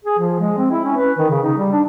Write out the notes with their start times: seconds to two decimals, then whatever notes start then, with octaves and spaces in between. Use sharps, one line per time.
0.05 G#4
0.19 F3
0.40 G#3
0.58 C4
0.72 E4
0.85 C#4
0.97 B4
1.18 D#3
1.31 C#3
1.43 D#4
1.57 G3
1.73 D4